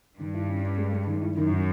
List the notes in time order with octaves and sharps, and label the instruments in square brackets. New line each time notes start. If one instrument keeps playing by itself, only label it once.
[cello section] G2 [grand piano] D#3
[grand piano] E4
C#4
C#4
G#3
G#3
D#3
E4
[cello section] F#2 [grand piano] D#3
[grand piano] D#3